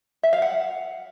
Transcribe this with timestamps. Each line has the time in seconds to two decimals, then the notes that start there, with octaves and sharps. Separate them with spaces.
0.23 E5
0.33 F5
0.42 F#5